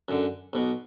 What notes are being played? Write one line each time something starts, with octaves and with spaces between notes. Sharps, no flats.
F#2 D3
B1 B2